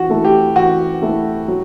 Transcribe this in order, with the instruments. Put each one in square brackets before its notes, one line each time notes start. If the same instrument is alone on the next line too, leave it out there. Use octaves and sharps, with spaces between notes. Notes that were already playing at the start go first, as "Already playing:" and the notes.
Already playing: [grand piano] E3 [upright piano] F#4
[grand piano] A3 E4 A4
[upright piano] G4
[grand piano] E3 [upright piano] F#4
[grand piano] A3 E4 A4
F#3